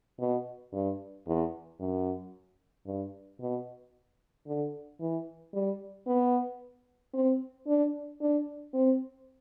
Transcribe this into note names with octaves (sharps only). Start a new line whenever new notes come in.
B2
G2
E2
F#2
G2
B2
D3
E3
G3
B3
C4
D4
D4
C4